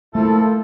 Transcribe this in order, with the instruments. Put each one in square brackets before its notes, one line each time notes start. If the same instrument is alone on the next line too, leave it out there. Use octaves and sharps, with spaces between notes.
[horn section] F3 A#3 E4 A4 [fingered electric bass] A3